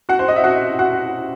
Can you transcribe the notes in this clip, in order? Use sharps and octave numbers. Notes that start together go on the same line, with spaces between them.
F#4 F#5
C5
D#5
E5
F#4 F#5
F#4 F#5